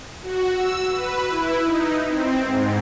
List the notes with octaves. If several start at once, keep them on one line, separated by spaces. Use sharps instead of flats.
F#4
E6
B4
E4
D#4
C4
G#2